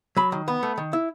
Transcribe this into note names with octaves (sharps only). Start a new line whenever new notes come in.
F#3 B5
D#3
B3
A3
D#3
E4